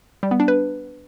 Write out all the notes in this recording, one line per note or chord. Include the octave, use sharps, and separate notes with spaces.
G3
B3
D4
B4